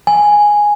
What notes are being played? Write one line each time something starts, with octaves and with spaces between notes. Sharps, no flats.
G#5